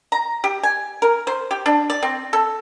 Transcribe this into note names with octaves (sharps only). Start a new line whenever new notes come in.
A#5
G4
G#5
A#4
C5
G4
D4
D5
C4
A4